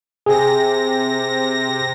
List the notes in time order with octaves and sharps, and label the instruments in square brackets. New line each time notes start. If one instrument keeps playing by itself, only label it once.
[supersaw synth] C3 A#6 [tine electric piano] G#4